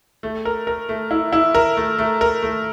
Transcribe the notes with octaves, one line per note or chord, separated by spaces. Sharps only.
A3
A#4
A#4
A3
E4
E4
A#4
A3
A3
A#4
A3